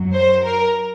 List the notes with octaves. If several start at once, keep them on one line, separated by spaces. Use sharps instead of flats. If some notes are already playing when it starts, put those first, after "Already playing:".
Already playing: F#2 F#3
C5
A#4